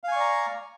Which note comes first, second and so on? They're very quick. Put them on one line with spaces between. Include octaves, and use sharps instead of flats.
F5 G#5 C#6 D5 A#5